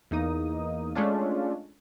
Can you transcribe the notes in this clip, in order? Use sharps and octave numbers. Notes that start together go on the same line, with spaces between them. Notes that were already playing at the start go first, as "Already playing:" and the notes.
E2 A#3 D#4 D#6
G#3 A3 C#4 D4 F4